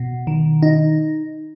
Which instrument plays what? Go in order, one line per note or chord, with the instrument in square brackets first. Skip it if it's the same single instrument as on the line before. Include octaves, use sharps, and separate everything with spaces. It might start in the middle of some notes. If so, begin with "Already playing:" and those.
Already playing: [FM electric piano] B2
D#3
D#4